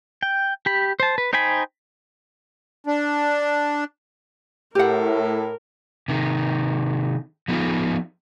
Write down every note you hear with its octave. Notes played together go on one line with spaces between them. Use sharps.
G5
G4 B5
C5 A5
B4
D#4 C5 G5 G#5 B5
D4
A2 G4 A#4 F#5
C3 D#3
F3 B3 D#4 F4